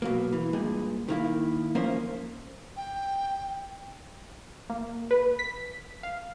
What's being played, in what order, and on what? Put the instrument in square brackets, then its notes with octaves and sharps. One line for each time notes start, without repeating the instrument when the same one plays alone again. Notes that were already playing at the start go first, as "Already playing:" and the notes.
[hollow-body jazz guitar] B2 F#3 A#3
E3
G2 A#2 G#3
D#3 A#3 E4
F3 A#3 C#4 A#4 C5 E5
[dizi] G5
[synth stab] A#3
B4
B6
F5